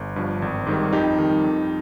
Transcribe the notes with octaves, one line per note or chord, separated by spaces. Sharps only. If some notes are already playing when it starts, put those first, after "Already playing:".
Already playing: G1
G2 F3
G#1
G#2 D#3 G3
F2 D#4 G4
D#3 G3
F2